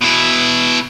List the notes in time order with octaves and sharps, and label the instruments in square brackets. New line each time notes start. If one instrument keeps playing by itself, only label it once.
[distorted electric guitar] B2 E4